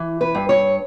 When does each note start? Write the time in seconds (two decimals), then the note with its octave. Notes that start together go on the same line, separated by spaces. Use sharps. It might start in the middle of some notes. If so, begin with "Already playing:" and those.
Already playing: E3
0.21 B4
0.35 G2
0.49 C#5